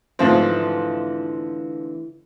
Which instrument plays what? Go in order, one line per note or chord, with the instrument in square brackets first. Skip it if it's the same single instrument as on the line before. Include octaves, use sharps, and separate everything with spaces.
[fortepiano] G#2 F3 C4 [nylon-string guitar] D3 E3 A3